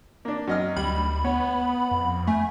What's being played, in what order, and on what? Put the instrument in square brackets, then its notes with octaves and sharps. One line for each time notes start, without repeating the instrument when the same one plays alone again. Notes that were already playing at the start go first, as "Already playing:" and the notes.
[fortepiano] A#3 D4
F#2 D#5 F6
[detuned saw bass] D2 [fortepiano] G3 [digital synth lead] B5
[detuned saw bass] B3 [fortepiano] C#5 [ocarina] F#5
[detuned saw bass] F2
[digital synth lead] A3 [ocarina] G#5